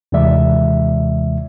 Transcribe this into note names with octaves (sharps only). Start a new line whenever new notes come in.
D#2 C3 E3 G#3 D5 E5